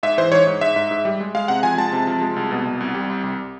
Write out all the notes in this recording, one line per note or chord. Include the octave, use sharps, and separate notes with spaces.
G#2 E5
E3 C5
G#2 C#5
G#2
G#2 E5
G#2
G#2
G3
G#3
G#3 F5
C3 F#5
F3 G#5
G#3 A5
C3
F3
G#3
C2
B2
C2
C2
G3
C2
C2